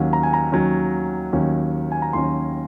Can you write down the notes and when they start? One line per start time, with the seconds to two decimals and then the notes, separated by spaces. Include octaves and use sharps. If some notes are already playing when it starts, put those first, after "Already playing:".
Already playing: D#2 D#3 F#3 C#4 F#5
0.13 A#5
0.23 G#5
0.33 A#5
0.52 D#2 D#3 F#3 C#4
1.33 D#2 D#3 F#3 C#4
1.92 G#5
2.02 A#5
2.13 D#2 D#3 F#3 C#4 C6